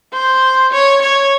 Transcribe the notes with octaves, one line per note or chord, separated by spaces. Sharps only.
C5
C#5
C#5